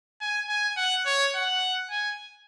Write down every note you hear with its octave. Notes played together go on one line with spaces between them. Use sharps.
G#5
G#5
F#5
C#5
F#5
G#5